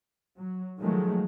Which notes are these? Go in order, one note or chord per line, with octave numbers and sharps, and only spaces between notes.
F#3
D#3 F3 F#3 G#3 A3